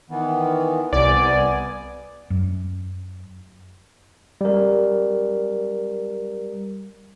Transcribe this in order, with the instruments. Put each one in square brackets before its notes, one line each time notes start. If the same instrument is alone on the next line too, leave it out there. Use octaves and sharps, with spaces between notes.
[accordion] D#3 E3 B3
[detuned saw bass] C2 [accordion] B3 G#5 [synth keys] D5
[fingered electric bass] F#2
[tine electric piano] G3 A#4